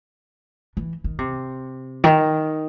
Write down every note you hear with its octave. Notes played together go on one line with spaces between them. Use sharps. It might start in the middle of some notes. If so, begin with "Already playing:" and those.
E3
D#3
C3
D#3